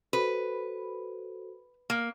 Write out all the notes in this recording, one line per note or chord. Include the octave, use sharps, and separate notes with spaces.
F#4 A4 B4 C5
A#3